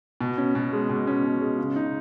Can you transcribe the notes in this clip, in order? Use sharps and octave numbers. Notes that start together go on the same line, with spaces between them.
B2
C#4
B2
G#3
B2
C#4
B2
G#3
C#3
D#4